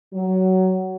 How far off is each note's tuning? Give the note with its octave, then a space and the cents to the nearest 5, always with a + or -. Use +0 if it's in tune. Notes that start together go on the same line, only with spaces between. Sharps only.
F#3 +15